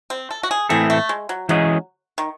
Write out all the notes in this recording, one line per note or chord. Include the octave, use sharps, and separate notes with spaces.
C4
A4
F#4
G#4
A2 E3 C4 E4 G#4 A4
A3
G#3
F#3
E3 F#3 G#3 C#4 G#4 D#5
D#3